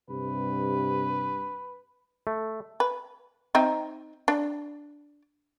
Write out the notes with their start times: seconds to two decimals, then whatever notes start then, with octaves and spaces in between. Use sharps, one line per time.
0.10 G2 C3 B4
2.27 A3
2.80 B4
3.55 C4 D#4 E5
4.28 D4